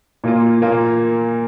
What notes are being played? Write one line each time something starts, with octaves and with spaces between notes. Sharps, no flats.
A#2 A#3 F4
A#2 A#3 F4